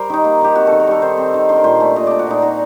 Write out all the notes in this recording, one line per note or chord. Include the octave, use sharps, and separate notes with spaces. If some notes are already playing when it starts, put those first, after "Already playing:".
Already playing: G3 A#4 C5
D#3 D#4
A#3
D#3 G4
C4 F#4
D#3 A4
A#4
G3 A4
D#3 C5
C4
D#3
D4 C5
A#4
A#2 C5
A3
A#2 D#5
D4 D5
F#4
A#2 D#4
D#4 F#4